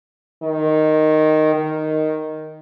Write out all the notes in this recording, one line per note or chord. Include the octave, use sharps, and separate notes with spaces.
D#3
D#3